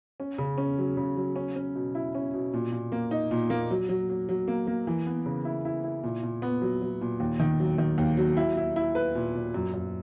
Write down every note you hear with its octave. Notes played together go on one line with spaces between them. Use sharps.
C#4
C#3
C#4
F#3
C#3
F#3
C#4
C#4
B2
E4
C#4
B2
A#2
A#2
A#3
D#4
A#2
A#3
F#3
F#3
F#3
F#3
A#3
A#3
E3
B3
C#3
E4
E4
E4
A#2
A#2
B3
F#3
F#3
A#2
D#2
D#3
F#3
D#3
D#2
F#3
E4
E4
E4
B4
A#2
A#2
F#2
F#2